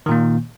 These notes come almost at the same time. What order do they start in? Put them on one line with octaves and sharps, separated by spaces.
D#3 A#2 A#3